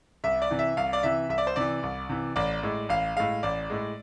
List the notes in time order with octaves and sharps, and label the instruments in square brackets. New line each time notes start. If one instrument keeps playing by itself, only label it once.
[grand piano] C2 E5
D5
C3 E3
E5
C2 F5
D5
C3 E3 E5
C2 E5
D5
C5
C3 E3 D5
C2
C3 E3
A1 D5
A2 G#3
A1 F5
A2 G#3 F5
A1 D5
A2 G#3